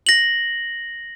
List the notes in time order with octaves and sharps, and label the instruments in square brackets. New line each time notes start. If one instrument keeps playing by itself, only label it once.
[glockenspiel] A#6 F#7